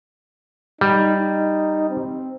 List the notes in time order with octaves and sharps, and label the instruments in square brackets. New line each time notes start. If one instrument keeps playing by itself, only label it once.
[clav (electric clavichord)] G3 [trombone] D#4
[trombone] D#4
C4